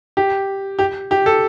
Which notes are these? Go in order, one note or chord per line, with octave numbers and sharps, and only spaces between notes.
G4
G4
G4
A4